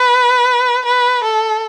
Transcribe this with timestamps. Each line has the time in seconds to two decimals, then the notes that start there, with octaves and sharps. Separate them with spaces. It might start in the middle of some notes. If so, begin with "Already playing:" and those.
Already playing: B4
0.85 B4
1.23 A4